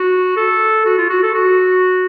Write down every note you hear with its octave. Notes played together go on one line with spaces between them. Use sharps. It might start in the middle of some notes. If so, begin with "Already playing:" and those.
Already playing: F#4
A4
F#4
F4
F#4
A4
F#4